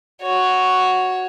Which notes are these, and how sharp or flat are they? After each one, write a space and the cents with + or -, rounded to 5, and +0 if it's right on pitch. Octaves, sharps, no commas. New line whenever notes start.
F#4 +0 C#5 +0